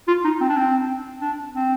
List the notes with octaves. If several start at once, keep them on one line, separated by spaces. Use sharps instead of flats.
F4
D#4
C4
D4
C4
D4
C4